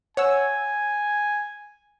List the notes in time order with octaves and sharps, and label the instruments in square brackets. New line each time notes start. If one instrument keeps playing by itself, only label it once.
[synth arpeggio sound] C#5 F#5 E6 [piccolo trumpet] G#5